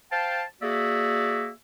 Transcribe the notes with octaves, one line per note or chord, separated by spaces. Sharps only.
C5 F5 G5 A5
A#3 F#4 G#4 D5 E5